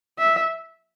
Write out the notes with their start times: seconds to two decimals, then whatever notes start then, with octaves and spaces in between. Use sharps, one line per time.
0.19 E5